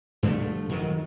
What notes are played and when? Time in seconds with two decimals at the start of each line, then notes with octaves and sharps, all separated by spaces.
0.23 G2 D3 F3 A3
0.69 F2 D#3 F#3